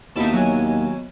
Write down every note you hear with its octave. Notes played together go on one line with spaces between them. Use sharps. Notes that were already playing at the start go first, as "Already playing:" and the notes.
D#2 B2 D#4 E4 E5 A5
F#3 G#5